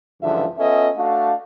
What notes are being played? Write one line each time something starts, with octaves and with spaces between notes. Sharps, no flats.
C#2 G2 D3 E3 F3 E5
B3 C#4 F4 A4 D#5 E5
A3 D4 F#4 F5